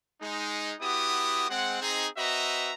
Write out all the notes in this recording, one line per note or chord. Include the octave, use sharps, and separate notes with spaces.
G#3 D#4
B3 E4 F#4 G4 D#6
G#3 C4 F#5
C4 D#4 G#4
C4 F#4 B4 D#5 E5 A#5